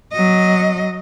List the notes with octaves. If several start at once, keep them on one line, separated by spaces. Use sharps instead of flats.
F#3 D#5